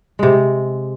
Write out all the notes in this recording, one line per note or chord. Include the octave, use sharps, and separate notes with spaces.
C3 G#3